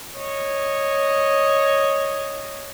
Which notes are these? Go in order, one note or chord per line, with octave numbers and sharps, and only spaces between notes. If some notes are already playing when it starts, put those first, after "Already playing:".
C#5 D#5